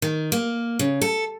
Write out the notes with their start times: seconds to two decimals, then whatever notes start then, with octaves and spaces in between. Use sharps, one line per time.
0.02 D#3
0.32 A#3
0.79 C#3
1.01 A4